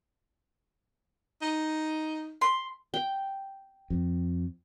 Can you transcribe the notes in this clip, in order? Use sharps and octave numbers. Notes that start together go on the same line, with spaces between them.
D#4
C6
G5
F2